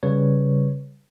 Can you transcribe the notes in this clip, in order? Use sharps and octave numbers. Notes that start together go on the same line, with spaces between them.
C#3 G3 B4 C#5